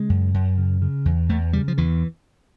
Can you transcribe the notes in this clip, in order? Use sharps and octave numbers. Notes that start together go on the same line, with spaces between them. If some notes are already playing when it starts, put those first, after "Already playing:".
Already playing: C#3 G#3
F#2
F#2
C#3
C#3
E2
E2 A3
C#3 G3
F3
E2 E3